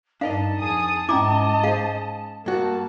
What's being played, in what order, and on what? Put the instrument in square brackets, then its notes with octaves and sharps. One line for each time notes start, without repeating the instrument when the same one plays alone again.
[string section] G2 [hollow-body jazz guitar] D4 A#4 D#5 [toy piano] D#4 F5 [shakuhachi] A5
[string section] F2 G#4 D#6
[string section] G#2 D#5 [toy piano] C#4 A#5 D6 [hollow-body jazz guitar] E4 E5
[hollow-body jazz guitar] G#4 C5 [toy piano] F5
[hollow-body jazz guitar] G2 F#4 [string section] A#3 A5